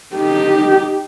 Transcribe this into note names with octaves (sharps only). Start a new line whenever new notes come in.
D#4 G4